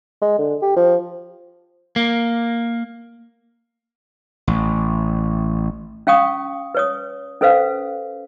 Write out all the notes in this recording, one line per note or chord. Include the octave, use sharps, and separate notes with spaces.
G#3
D3
G4
F3
A#3
A1
C#4 F5 G5 C#6 D#6
B4 C#5 D#6
C#4 A4 B4 C5 F5